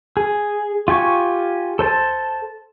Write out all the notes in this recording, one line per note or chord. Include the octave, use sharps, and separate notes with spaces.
G#4
F4 G4 G#5 C#6
A4 C5 A5